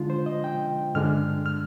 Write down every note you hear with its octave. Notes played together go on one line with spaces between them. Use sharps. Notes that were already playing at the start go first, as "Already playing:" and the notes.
Already playing: D3 G#3 D4 F4
C5
D#5
G5
G2 D3 G#3 D4 F6
F6